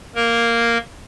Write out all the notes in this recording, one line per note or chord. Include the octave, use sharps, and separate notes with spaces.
A#3 A#4